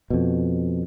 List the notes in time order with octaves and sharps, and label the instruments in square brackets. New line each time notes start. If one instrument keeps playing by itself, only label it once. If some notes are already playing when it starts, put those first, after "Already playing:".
[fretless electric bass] F2 B2